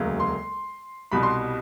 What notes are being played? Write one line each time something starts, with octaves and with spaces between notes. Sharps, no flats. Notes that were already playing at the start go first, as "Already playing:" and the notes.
Already playing: E1 D2 C#3 F#3 A#3
C6
C2 B2 G3 B5
C6